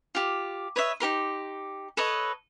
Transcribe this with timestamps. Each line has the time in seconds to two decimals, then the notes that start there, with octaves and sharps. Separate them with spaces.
0.15 F4 G4
0.76 B4 C#5 D#5 E5
1.00 D#4 G4 A#4 C6
1.97 A4 B4 C#5 D#5